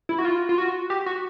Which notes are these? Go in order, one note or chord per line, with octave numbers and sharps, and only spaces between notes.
E4
F#4
F4
F4
F#4
G4
F#4